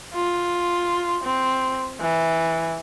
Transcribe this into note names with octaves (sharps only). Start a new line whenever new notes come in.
F4
C4
E3